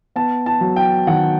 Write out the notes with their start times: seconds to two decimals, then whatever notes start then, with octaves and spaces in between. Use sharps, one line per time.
0.16 B3 A5
0.46 A5
0.61 F#3
0.76 G5
1.07 D#3 F#5